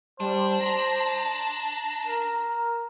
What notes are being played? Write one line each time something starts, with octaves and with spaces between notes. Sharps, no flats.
G3 D4 C5
A#5
A#4